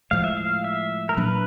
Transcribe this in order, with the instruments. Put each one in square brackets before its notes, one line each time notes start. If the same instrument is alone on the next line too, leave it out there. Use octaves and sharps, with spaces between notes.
[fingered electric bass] A2 F3 G#3 [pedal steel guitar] F5
[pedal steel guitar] E5
F5
E5
A#4
[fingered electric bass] A#2 F#3 A#3 D4 [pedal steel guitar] B4